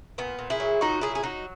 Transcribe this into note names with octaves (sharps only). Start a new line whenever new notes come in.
A#2 B3
A#2
E4 G#4
F#3
A#2 D#4 F#4
F#3 E4 G#4
G#4
F#3 D#4 F#4